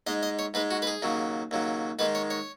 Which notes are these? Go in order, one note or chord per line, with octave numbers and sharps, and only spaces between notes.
G#2 G#3 D#5
D#5
C#5
G#2 G#3 B4
F#4
B4
G#4
D#2 C#3 F#3
D#2 C#3 F#3
G#2 D#3 G#3 B4
C#5
C#5